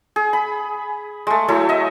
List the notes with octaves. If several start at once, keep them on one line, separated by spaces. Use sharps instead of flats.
G#4
B5
G#3 A3
F#3 A3 E4
D#5 E5